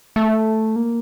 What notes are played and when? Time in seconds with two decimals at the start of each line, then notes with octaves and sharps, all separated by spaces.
0.16 A3
0.76 A#3